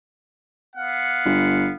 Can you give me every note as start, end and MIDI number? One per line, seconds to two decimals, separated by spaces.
0.76 1.76 59
0.76 1.76 77
0.76 1.76 78
1.25 1.71 31